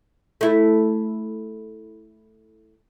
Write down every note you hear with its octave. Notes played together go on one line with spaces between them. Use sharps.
A3 E4